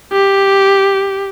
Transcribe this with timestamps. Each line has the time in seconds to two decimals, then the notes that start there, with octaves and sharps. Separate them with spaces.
0.12 G4